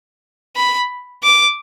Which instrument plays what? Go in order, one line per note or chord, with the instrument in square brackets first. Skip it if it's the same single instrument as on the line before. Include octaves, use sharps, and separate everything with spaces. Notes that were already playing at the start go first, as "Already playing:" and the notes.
[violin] B5
D6